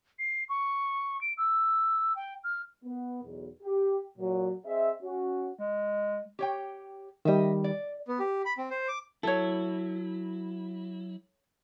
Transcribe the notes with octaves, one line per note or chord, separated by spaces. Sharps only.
C7
C#6
D7
E6
G5
F6
B3
B1 E2
G4
A#2 F#3
C4 G#4 D#5 E5
C#4 F#4
G#3
G4 C#5 G5
D#3 G3 D#5 E5
D5
B3
G4
B5
C4
C5
D6
F#3 E4 A4 C#5